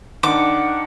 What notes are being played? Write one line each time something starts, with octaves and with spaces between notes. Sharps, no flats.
D#3 D4 F#5 D6